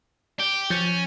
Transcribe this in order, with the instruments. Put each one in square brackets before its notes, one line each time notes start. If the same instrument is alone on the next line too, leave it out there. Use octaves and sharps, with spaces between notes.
[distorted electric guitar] G4
[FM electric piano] F3 G6 A6 [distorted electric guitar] C#4